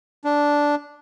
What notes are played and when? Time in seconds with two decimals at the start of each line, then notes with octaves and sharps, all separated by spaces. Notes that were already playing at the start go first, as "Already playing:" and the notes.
0.24 D4